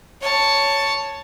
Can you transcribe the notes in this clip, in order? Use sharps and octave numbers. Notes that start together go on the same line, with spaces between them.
C#5 A5